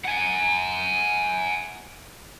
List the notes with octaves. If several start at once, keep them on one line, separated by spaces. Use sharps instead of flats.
F#5 G#5